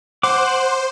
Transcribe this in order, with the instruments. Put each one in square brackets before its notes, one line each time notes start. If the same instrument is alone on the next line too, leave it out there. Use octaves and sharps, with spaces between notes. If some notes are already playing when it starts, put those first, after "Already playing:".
[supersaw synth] C5 [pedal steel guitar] F#5 D6